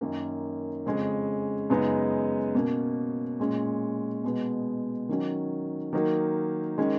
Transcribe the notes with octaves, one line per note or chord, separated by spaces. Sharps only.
F#2 D#3 A#3 C#4
F2 C#3 G#3 C#4
F#2 C#3 G#3 B3 D#4
B2 A#3 C#4
A#2 G#3 C#4
B2 G#3 B3
D#3 F#3 C#4
D#3 F#3 A#3 D#4
D#3 G#3 C#4